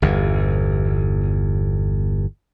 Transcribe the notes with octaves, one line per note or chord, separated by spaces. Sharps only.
G1 E2